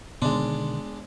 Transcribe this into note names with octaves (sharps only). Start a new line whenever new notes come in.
B2 D3 D#3 G#3 B3 D4